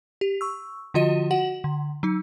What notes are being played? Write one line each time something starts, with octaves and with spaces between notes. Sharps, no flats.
G4
C#6 E6
D3 F3 F4 F#4 D#5 D#7
F#4 F#5 F#7
D3
F#3 D#4